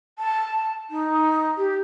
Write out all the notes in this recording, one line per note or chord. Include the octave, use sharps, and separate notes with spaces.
A5
D#4
G4